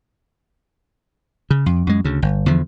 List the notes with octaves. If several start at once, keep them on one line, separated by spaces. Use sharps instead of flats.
C#3
F2
F#2 G#3
D2 C#3
G1
E2 D3 F3